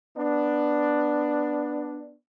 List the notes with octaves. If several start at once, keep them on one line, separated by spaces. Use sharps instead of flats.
B3 D4